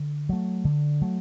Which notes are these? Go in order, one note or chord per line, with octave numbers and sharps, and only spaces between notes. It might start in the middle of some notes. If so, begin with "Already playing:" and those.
Already playing: D3
F#3 A3
D3
F#3 A3